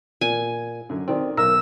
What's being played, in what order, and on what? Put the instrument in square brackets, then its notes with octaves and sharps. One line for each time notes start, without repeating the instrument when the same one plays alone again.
[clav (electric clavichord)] A#2 [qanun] G#5
[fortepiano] F#2 D3
[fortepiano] D#3 D5 [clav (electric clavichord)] C4
[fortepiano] B1 [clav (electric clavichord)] A#4 [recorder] E6